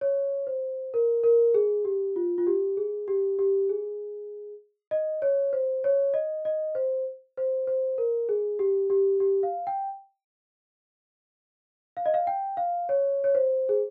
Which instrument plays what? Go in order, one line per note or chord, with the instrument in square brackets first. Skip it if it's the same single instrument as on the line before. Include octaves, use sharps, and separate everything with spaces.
[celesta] C#5
C5
A#4
A#4
G#4
G4
F4
F4
G4
G#4
G4
G4
G#4
D#5
C#5
C5
C#5
D#5
D#5
C5
C5
C5
A#4
G#4
G4
G4
G4
F5
G5
F5
D#5
F5
G5
F5
C#5
C#5
C5
G#4